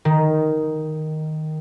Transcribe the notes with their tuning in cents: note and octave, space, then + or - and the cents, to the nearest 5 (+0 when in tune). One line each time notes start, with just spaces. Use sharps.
D#3 +0